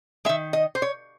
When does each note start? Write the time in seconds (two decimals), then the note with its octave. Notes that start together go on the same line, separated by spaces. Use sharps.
0.25 D#3 G#3 E5
0.53 D#5
0.75 C5
0.82 C#5